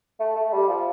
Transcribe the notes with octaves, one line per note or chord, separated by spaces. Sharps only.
A3
A3
G3
F3